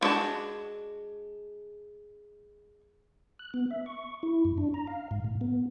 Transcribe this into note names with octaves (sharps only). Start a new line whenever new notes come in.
F3 G#3 D4 F#4 A5
F#6
B3
E5
C#6
E4
F#2
D4
A#5
F5
G#2
A2
B3